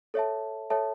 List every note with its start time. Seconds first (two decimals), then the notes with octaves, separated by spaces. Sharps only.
0.14 A4 C#5 E5 A5
0.70 A4 C#5 E5 A5